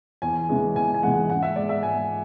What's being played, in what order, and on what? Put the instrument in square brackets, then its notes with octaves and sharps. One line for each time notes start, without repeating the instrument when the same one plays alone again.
[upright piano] E2 G#5
C#3 E3 G#3
E2 G#5
G#5
C#3 E3 G#3 F#5
G#2 F#5
E5
G#3 D5
E5
G#2 G#5